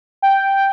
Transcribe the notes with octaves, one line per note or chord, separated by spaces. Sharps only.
G5